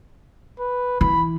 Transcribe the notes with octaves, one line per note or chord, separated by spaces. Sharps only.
B4
E3 B5